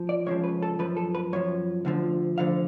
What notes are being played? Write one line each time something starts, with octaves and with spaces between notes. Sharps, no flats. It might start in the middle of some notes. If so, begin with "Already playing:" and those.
Already playing: F3
D5
C#2 C#3 F3 C#5
B4
A4
F#2 F3 B4
A4
B4
F#2 F3 C#5
D2 D3 F3
D2 D3 F3 F5